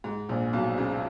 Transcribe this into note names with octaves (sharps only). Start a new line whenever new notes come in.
G#2
A#1 A#2
B1 B2
C#2 C#3